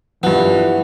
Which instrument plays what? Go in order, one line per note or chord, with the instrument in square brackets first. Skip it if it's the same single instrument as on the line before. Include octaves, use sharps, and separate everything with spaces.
[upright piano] G2 F3 [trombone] E3 [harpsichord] B3